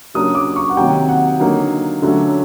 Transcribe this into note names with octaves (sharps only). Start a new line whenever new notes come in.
C#3 F#3 A#3 D4 D#6
D6
C#6
F#5
C3 D#3 F#3 A#3 G5
F#5
D3 F#3 A#3 D#4
D3 F#3 A3 C#4